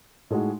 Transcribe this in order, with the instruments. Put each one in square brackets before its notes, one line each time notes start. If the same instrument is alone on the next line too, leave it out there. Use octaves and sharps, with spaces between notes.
[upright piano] A2 G#3 D#4 F#4